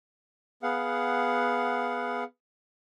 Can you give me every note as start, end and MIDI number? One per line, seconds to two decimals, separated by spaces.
0.63 2.24 59
0.63 2.24 68
0.63 2.24 77
0.63 2.24 78